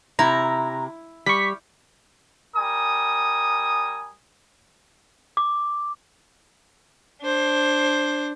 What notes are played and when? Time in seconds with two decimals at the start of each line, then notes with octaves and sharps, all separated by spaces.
0.19 C3 E4 A#5
1.26 G3 C#6 B6
2.55 G3 A#4 G#5 D#6
5.37 D6
7.22 D4 C5